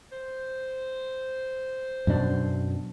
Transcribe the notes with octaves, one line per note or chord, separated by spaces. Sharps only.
C5
F#2 B2 D4